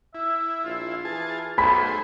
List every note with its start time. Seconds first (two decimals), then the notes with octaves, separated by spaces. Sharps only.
0.15 E4 E5
0.64 A#1 F4
1.05 E3 G#4 A5
1.58 B1 A3 G#4 C5 B5 B6